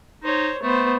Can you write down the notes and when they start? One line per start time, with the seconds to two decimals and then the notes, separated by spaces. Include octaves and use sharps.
0.24 D#4 C5 C#5
0.63 A3 B3 C5